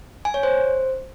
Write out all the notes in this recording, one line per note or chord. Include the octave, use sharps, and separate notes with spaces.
G#5
C#5
C5